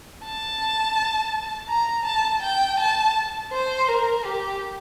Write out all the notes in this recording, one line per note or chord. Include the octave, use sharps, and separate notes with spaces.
A5
A#5
A5
G5
A5
C5
A#4
G4